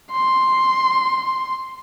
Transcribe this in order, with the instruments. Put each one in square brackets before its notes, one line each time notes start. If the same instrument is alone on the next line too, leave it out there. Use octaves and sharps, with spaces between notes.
[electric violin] C6